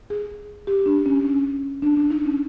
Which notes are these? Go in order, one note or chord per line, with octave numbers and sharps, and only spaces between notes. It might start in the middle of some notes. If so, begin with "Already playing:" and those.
G#4
G4
D4
C#4
C#4
D4
D4
D#4
C#4